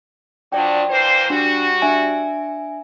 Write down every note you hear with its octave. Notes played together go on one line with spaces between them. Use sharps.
F3 F#3 D4 D5 G5
E3 A#3 C5
G3 D4 F#4
D4 E5 G#5